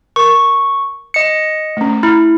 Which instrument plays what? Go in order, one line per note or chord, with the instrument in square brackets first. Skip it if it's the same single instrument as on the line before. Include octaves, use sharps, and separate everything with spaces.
[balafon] A#4 [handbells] C#6
[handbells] D#5 C#7
[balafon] A3 C#4
[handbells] E4 [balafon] A#5